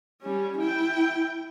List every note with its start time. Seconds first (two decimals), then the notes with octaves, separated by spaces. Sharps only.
0.22 G3 C#4
0.58 E4 G5